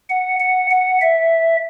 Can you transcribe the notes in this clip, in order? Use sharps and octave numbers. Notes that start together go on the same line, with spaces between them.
F#5
F#5
F#5
E5